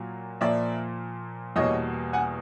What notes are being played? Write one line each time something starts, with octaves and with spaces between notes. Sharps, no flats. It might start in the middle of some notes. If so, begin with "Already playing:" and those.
Already playing: A#2 F#3 A#3
A#2 F3 A#3 D5 E5
E2 B2 G3 A#3 C#5 D#5
F#5 G#5